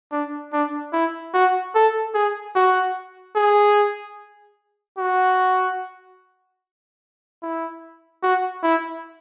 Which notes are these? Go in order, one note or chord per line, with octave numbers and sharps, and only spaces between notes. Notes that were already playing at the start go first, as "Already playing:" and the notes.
D4
D4
E4
F#4
A4
G#4
F#4
G#4
F#4
E4
F#4
E4